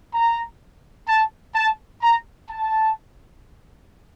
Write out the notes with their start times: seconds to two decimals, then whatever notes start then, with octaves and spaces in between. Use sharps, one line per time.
0.14 A#5
1.08 A5
1.55 A5
2.02 A#5
2.49 A5